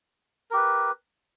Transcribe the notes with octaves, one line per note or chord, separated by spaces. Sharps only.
G4 A#4 B4